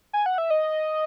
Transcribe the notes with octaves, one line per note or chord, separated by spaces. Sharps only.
G#5
F#5
E5
D#5